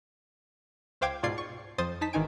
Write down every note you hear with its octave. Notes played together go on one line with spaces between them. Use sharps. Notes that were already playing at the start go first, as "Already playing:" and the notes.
C#2 C5 F5 G5 D6 G#6
G#2 B2 F4 D5 G#6 C7
C#6
F2 F3 C5 D#6 A6
D#4 A5 B6
G#1 D#3 E3 D#4 G#5 D7